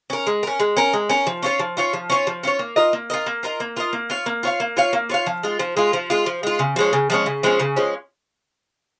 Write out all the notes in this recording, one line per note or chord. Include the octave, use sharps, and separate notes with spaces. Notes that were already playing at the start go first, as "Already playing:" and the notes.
C#4 A#4
G#3
C#4 A#4
G#3
C#4 A#4
G#3
C#4 A#4
F3
C#4 F4 C#5
F3
C#4 F4 C#5
F3
C#4 F4 C#5
F3
C#4 F4 C#5
A#3
F4 A#4 D#5
A#3
F4 A#4 D#5
A#3
F4 A#4 D#5
A#3
F4 A#4 D#5
A#3
F4 C#5 F5
A#3
F4 C#5 F5
A#3
F4 C#5 F5
A#3
F4 C#5 F5
F3
G#3 F4
F3
G#3 F4
F3
G#3 F4
F3
G#3 F4
C#3
F3 G#3 C#4
C#3
F3 G#3 C#4
C#3
F3 G#3 C#4
C#3
F3 G#3 C#4